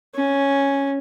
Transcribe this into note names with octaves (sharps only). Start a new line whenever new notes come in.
C#4